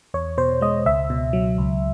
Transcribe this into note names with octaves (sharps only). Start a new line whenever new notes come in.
E2 C#5
B2 C5
G#3 D#5
C#2 E5
B2
F#3
C#2